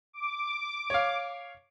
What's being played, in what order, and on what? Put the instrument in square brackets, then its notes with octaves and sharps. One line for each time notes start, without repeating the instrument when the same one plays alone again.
[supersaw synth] D6
[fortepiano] C#5 F5